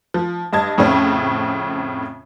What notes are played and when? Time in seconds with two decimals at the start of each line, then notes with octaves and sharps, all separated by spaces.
0.14 F3
0.53 G2 D#5 A5 G#6
0.78 F2 A2 C#3 C4 C#4